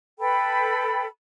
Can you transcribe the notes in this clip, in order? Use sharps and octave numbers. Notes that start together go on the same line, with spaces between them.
A4 B4 G5 B5